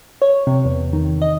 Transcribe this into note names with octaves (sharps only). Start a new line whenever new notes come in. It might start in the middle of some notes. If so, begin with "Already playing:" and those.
C#5
C3
E2
D#3
D#5